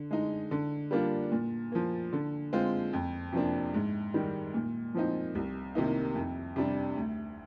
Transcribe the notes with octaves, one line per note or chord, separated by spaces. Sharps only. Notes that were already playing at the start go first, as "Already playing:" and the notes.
Already playing: D3
G#3 D#4
D3
G3 A#3 D4 F4
A#2
F3 A#3
D3
G#3 C4 F4
F2
C3 F3 A#3 D4
G#2
D#3 G3
A#2
F3 C4 D#4
C2
C3 D#3 A#3 D#4
F2
C3 G3 D4
D2